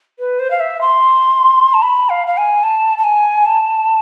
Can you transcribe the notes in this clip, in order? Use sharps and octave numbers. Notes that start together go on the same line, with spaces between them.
B4
C5
F5
E5
C6
A5
B5
F5
F5
G#5
A5
A5
G#5
A5